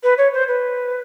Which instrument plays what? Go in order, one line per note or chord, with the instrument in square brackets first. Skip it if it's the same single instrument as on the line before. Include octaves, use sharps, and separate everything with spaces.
[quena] B4
C#5
C5
B4